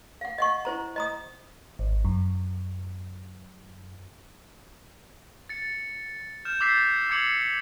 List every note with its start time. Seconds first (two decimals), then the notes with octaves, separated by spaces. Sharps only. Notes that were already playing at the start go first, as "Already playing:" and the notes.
0.21 F5 F#5
0.38 D#5 F#5 C#6
0.65 E4 C5 A#5
0.96 D#5 A#5 D#6
1.79 G#1
2.05 F#2
5.49 A6 C#7
6.45 F6 G6 E7
6.61 D6 E6 G6 A6 B6 C7
7.10 D6 G#6 C#7 F7 F#7